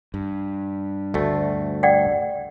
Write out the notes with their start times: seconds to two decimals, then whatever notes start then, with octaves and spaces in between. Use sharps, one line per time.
0.14 G2
1.14 D2 A3
1.83 D5 F#5 G5